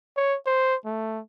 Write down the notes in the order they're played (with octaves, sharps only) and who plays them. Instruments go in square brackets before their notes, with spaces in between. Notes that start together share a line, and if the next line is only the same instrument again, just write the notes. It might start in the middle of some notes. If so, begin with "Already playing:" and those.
[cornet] C#5
C5
A3